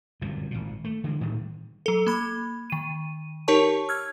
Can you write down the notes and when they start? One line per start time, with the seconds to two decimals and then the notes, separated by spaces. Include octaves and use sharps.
0.21 G1 C2 F#2 A#2
0.51 G#1 A#2
0.84 A3
1.04 D3 E3 G#3
1.20 A2 D#3 G3 G#3
1.86 F#3 A4
2.07 A#3 B5 G#6
2.70 D#3 D#7
3.48 D#4 G4 A#4 C#5 A5 C#6
3.89 E6 F6 G#6